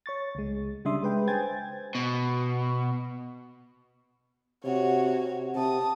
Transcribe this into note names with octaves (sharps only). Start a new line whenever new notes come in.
C#5 C#6 A6
C#2 G#3
C#3 G3 D4 E5 C6 D#6
G#3 B4 G5
C5 G5 G#5 G#6 A6
B2
C3 F#4 C#5
C3 A5 D#6